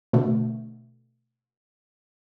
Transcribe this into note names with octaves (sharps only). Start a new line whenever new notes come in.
B2 D3 A3